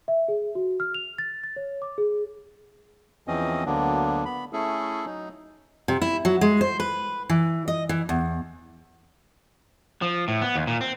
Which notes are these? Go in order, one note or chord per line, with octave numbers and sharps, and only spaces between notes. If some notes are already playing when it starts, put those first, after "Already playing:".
E5
G#4
F#4
F6
F7
A6
A6
C#5
D6
G#4
E2 E3 F3 C4 C#4 D#5
D2 D3 F#3 A#3 B3 D4
B3 B5
A3 C#4 E4 G#4 A4
F#3 D#4
C3
E4
F#3
G#3
C5
B4
E3
D#5
E3
E2
F3
A2
B3
D#2
A#2
C4